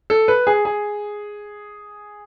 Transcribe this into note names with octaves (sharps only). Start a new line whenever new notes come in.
A4
B4
G#4
G#4